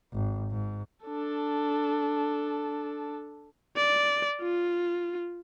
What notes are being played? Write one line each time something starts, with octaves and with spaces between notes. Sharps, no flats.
G#1
G#2
D4 A4
D5
F4